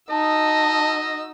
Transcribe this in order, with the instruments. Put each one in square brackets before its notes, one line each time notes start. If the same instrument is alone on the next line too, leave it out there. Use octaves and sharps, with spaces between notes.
[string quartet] D#4 F#4 E6 [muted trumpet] D#5 [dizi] A5